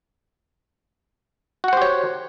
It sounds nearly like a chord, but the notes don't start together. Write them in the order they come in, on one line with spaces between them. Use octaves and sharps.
F#4 F#5 C5 G4 C#5